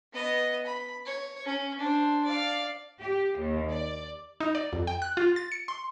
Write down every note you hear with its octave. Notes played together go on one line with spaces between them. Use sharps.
B3 D#5
B5
C#5
C#4
D4 C5
D5 F5
G4
D#2
D5
D#4
D5
F2
G5
F#6
F4
A6
C#7
C6